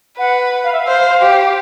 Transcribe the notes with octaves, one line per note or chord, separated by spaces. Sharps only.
B4 F#5
F5
E5
F5
C5
G4